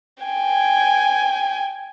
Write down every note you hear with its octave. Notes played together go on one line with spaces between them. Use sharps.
G5 G#5